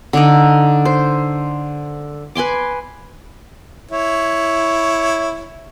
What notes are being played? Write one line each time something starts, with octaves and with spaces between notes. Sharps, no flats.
D3 D4 D#4
C5
B4 G#5 C6 D6
E4 C#5